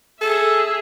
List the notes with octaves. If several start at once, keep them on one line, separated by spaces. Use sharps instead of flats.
G#4 A4 E5